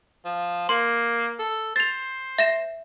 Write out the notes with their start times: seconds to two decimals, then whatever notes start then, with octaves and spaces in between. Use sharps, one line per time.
0.25 F3
0.69 A#3 C6
1.39 A4
1.76 C5 A6 F7
2.38 E5 A#6 E7